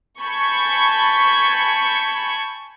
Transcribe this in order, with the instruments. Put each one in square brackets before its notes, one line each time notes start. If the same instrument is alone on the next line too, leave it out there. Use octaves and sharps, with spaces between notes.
[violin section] G#5 A5 B5 C#6 G6 G#6